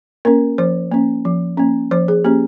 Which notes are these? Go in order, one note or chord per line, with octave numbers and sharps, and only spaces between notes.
A#3 C#4 A#4
F3 C5
A#3 C#4
F3
A#3 C#4
F3 C5
G#4
A#3 C#4 G4